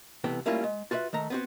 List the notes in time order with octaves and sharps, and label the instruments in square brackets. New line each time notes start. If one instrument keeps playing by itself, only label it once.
[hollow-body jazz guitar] C2 C3 E3 B3 A4 G5
G3 A3 A#3 C#4 E4 F4
G#3
F4 F#4 B4 C#5 E5
D#3 A3 A#5
B3 C4 F#4